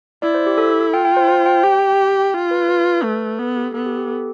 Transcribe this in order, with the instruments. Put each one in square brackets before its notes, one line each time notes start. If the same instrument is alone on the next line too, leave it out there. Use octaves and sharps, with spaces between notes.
[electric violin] E4 [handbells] D5
[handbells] C5
G4
A4
[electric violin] F4 [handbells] G5
[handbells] G5
C5
C5
G5
[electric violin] G4 [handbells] G5
[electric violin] F4
[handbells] B4
B4
[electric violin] A3
[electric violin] B3 [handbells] A4
[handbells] G4
[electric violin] B3 [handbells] A4
[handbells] G4
G4
A4